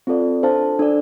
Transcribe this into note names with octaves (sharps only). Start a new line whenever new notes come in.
C4 F4 A4 D5 F5
D4 A4 C5 F5 A5
D4 A4 D5